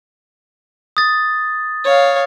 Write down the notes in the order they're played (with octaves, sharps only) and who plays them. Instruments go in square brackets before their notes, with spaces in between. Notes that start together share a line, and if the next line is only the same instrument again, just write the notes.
[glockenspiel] D#6 A6
[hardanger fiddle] C#5 F5